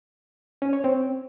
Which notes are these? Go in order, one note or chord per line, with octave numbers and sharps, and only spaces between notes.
C#4
C#5
C4